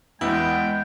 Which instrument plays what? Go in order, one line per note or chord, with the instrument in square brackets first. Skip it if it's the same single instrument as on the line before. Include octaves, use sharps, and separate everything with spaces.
[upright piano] E2 E4 [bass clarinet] G#3 [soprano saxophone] B3 [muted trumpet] G5